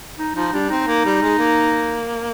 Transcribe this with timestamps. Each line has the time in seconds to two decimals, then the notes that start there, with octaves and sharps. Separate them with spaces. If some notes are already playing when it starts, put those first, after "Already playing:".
0.19 D#4
0.35 F3 D#4
0.53 G3 D4
0.70 C4 D#4
0.87 A#3
1.05 G3
1.22 G#3
1.39 A#3